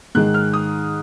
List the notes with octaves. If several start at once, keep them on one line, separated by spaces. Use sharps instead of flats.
G#2 D#3 G#3 F#6
F6
D#6